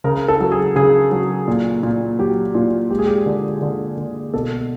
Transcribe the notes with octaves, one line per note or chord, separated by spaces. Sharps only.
C#3 A#4
A4
F#3
G#4
C#3 G#4
F#3
A#2
A#2
F#3 G4
A#2 F4
G#3 G4
G#4
G4
D3
D3
D3
B2 A4